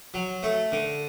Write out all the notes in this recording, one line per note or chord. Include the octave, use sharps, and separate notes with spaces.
F#3
A3
D3